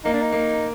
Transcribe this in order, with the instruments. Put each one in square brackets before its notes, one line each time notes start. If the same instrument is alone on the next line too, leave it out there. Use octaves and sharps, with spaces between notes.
[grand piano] A#3 [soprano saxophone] D#4
[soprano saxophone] D4
D#4
[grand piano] A#3